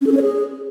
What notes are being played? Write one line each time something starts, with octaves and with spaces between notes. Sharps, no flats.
C#4
A4
C#4
C#5
G#4